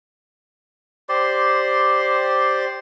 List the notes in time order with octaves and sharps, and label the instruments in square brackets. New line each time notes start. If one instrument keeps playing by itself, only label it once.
[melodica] G4 C5 D5 C6